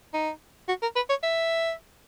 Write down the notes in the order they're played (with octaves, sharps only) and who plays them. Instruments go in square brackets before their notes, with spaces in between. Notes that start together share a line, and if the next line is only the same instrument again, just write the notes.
[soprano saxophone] D#4
F#4
A#4
B4
C#5
E5